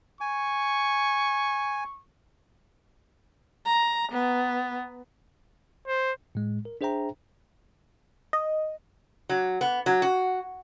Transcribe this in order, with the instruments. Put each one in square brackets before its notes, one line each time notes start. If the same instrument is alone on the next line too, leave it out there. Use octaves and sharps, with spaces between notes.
[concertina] G#5 [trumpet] C#6
[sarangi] A#5
B3
[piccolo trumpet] C5
[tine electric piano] A2 G#3
A#4
D4 G#4 C5 E5 G5 A#5
[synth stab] D#5
[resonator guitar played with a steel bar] F#3
B3
F#3
F#4